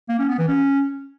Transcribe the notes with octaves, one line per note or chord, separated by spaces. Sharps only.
A#3
C#4
B3
E3
C#4